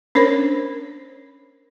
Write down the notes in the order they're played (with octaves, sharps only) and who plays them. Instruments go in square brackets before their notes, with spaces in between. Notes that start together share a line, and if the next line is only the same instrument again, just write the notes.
[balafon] C#4 D4 A#4 C5 C#5